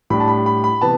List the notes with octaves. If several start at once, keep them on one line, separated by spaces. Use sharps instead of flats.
A2 G3 D4 B5
A5
B5
B5
B5
C3 E3 B3 A5